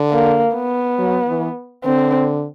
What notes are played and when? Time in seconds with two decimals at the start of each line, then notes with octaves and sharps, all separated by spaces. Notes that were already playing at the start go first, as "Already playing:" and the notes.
Already playing: D3
0.12 A#3
0.56 B3
0.98 F#3
1.28 E3
1.85 D3 C4